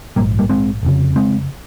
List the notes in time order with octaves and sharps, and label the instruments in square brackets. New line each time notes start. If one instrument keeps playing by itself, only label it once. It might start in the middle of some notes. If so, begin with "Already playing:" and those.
[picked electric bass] A#1 G3 A#3
G#2
G3 A#3
G#3 C4
F1 F2 C#3
G#3 C4